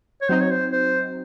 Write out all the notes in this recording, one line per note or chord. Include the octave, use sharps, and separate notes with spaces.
C#5
F#3 C4 D#4 C5
C#5
C5
C5